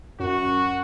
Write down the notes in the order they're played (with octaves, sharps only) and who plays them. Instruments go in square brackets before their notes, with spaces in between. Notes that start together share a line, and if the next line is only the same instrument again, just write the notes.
[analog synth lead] F#2 [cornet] F#4